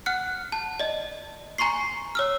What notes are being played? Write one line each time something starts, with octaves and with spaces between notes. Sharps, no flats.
F#5 F6 F#6 C#7
A5
D5 D#5
G#5 A#5 C6 C#6 C7
C#5 E6 F6